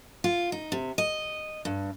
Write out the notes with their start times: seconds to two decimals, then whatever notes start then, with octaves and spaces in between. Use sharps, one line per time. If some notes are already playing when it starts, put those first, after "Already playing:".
0.24 F4
0.52 D#4
0.72 C3
0.98 D#5
1.65 G2